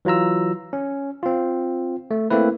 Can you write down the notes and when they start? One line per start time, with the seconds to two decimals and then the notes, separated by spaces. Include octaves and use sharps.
0.05 E3 F#3 F4 A#5 E6
0.73 C#4
1.23 C4 F4
2.11 A3
2.30 A3 A#3 C4 E4 B4